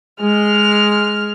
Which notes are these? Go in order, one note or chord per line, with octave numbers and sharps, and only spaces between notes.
G#3 F6